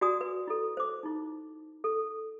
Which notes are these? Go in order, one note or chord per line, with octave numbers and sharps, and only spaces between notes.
F#4 D5 G#5 A#5 D#6
B4
E4 A4
C5 D6
D#4 E4
A4